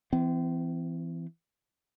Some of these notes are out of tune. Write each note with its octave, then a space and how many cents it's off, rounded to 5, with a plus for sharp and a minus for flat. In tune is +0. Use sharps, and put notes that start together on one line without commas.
E3 +20 C4 -35